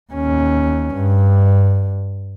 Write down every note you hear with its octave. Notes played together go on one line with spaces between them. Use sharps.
D#2 C#4
G2